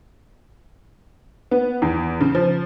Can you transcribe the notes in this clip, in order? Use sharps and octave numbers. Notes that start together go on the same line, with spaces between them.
B3
E2
C#3
F3